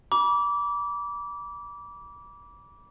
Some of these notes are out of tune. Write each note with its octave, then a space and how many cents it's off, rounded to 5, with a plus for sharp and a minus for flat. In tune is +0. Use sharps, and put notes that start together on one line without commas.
B5 -40 D6 -20